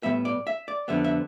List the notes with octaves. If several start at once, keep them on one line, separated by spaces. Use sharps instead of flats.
A2 G3 B3 E5
D5
E5
D5
F2 D3 G3 B3 E5
E5